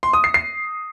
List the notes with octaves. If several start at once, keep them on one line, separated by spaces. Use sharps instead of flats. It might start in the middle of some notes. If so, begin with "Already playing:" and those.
C6
D#6
C7
C7